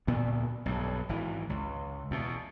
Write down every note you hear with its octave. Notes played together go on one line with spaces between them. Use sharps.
D2 A#2 B3
B1 G2
G#1 E3
C#2
E2 B2